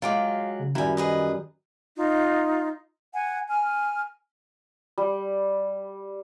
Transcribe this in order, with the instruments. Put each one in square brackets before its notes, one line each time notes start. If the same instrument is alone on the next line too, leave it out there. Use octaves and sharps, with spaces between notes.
[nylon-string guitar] F#3 G#3 [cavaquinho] F4 G5 D6 [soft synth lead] F5
[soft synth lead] C#3
[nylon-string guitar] F#2 G3 [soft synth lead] D#3 [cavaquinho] E4 G#5
[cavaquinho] G#4 B4 D#5
[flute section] D#4 F4
F#5 G#5
G#5 F6
[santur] G3